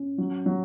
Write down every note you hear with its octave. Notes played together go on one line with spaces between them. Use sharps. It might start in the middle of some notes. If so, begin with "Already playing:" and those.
Already playing: C#4
F#3
F#3